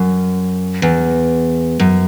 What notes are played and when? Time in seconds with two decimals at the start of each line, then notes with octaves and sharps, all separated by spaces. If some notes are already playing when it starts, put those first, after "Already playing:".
Already playing: F#2
0.82 E2
1.79 F#2